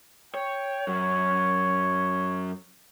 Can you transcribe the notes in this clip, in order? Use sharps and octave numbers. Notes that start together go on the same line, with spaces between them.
C#5 G5
F#2 F#3 C#5